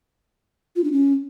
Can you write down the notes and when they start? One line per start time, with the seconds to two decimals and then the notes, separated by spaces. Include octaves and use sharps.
0.76 F4
0.84 D4
0.92 C#4